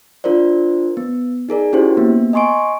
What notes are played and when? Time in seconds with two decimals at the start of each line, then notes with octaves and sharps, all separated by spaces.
0.24 D4 F4 A#4 C5 D5
0.97 B3
1.49 D#4 G#4 A#4 D5
1.73 C#4 E4 F#4 G4 C5
1.97 A#3 B3
2.33 D#5 G#5 C6 C#6 D7